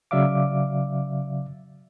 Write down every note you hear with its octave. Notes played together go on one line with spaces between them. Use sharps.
C#3 F#3 D5 E5 F5 D6